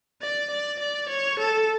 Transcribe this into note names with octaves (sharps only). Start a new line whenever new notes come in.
D5
D5
D5
C#5
A4